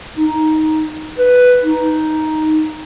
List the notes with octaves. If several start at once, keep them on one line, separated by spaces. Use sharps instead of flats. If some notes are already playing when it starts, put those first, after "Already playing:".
D#4
B4
D#4